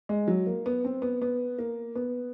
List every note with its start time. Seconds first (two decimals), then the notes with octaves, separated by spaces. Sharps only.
0.09 G#3
0.28 F#3
0.47 A#3
0.66 B3
0.84 C4
1.02 B3
1.22 B3
1.58 A#3
1.95 B3